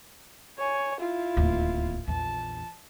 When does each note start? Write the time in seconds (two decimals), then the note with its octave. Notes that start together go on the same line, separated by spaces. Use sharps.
0.58 C#5 G#5
1.00 E4 F4
1.37 D1 D#2
2.07 A#1 E2 A5